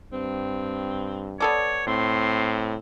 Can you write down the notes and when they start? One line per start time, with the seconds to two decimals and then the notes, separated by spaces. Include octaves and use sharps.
0.13 G2 C4
1.40 B3 A4 C#5 D5
1.87 A2 C4 C6